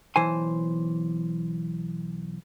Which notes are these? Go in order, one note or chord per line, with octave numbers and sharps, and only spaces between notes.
B1 E3 C5 G#5